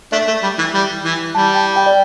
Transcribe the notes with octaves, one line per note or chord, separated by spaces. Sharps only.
A3 D4 E5
A3
G3
E3
G3
E3
G3 A5
G5
G5
D5